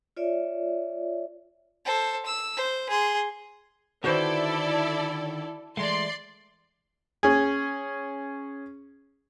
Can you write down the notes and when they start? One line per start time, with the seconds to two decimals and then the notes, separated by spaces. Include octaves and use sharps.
0.17 F4 C#5 D5 E5
1.85 A4 C5
2.26 E6
2.57 C5
2.90 G#4 C6
4.04 D3 D#3 E4 F#4 A4 B4 C5 D5
5.77 E3 G#3 A3 D5 C6
7.23 C#4 G#4